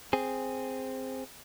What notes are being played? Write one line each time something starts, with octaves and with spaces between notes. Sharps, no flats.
C4 G#4